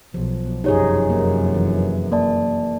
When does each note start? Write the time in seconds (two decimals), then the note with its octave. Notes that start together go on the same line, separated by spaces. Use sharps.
0.14 B1 F3
0.64 F1 F#2 D#4 G4 G#4 C#5
1.10 A#3
1.54 E3
2.12 A#3 D5 A5